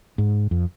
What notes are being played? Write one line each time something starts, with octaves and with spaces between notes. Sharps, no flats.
G#2
F2